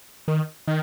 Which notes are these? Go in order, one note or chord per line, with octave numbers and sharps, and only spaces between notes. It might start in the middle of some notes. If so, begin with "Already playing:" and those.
D#3
D#3